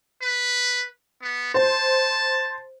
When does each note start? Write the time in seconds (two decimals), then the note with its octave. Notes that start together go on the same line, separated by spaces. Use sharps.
0.22 B4
1.22 B3
1.54 C5 A5